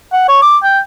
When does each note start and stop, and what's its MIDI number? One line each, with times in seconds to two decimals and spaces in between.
0.13 0.28 78
0.28 0.40 73
0.42 0.57 86
0.63 0.79 79